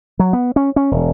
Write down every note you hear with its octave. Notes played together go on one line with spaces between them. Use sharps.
F#3
B3
C#4
C#4
E1